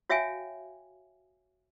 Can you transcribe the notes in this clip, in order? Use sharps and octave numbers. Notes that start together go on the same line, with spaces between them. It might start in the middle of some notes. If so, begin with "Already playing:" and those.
F#4 C#5 E5 F5 G5 G#5